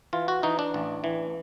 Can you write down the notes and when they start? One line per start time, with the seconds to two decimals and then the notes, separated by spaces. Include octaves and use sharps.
0.13 E3 F4
0.28 F#4
0.43 E3 D#4
0.59 D4
0.74 A1
1.04 E3